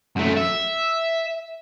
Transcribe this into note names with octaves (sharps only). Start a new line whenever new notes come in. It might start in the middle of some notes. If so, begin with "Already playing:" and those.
F#2 A3
E5